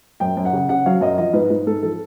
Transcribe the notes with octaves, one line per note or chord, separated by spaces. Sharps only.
F#2 G5
F#2
F#5
C#3
C#3 F#5
F#3 F5
F#2 D#5
F3 D#5
G#2 B4
G#2
G#2 A4
F3 A4